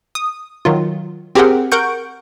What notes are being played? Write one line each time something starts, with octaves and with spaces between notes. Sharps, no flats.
D#6
D#3 F#3 F4
C4 G4 G#4 A#4 F#5 G5
A#4 F#5 C#6 G6 D7